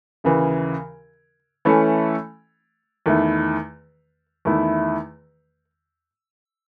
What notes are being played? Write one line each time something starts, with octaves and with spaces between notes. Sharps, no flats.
D#2 C#3 E3
E3 A3 C#4 E4 A4
E2 D#3 A3 E4
E2 D#3 A3 E4